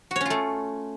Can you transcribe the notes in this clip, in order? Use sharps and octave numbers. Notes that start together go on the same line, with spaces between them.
A3 C#4 F4 F#4 C#5